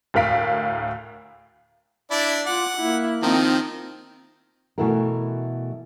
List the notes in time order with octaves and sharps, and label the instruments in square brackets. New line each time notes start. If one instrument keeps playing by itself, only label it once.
[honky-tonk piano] D2 A2 A#4 F5 B6 D7
[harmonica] D4 E4 D5
[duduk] F4 [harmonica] F#5 [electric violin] D6
[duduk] A#3 [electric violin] E4
[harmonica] D#3 F3 [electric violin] C4 D#4
[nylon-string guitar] B2 E3 A3 E4 F#4 A#4